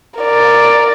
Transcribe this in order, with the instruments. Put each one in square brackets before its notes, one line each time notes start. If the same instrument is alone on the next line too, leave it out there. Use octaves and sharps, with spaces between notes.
[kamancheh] A#4 D5